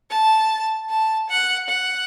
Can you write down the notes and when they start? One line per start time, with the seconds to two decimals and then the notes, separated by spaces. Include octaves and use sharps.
0.10 A5
0.90 A5
1.29 F#5
1.68 F#5